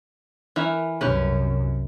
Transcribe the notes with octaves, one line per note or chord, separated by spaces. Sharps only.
E3 A#4 E5
C2 F#2 C#4 G4 B4